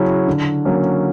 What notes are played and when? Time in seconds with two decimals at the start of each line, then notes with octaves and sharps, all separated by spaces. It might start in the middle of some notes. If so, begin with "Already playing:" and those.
Already playing: C#3 F#3 C#4 E4
0.28 D3
0.65 F#3 A#3 C#4